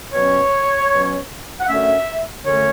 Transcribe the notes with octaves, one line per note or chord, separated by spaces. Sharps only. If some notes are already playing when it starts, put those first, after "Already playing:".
B2 F#3 C#4 C#5
B2 F#3 C#4
F#5
F#2 D3 A3 C#4 E5
F#2 D3 A3 C#4 C#5